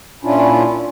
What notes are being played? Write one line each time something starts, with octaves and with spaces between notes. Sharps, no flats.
A#2 C#4 D4 E4 F4